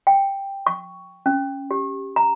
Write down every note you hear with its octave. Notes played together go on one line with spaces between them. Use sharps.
G5
C#6
C#4
G4
A#5